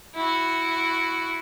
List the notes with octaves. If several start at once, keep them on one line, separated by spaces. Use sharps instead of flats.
E4 F#4